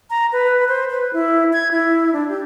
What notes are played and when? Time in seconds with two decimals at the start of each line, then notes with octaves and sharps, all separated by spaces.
0.10 A#5
0.32 B4
0.68 C5
0.90 B4
1.13 E4
1.53 G#6
1.71 E4
2.13 D4
2.29 G4